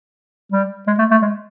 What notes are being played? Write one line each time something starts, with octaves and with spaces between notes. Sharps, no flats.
G3
G#3
A3
A3
G#3